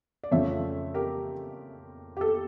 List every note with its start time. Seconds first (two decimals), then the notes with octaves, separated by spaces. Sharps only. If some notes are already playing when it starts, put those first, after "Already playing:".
0.24 D5
0.31 F2 C#3 F3 A3 C#5 E5
0.94 G4 A#4
2.17 G4
2.21 A4